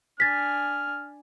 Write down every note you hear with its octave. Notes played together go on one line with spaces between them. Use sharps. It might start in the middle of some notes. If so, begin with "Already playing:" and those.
D4 G#5 F6 A6 B6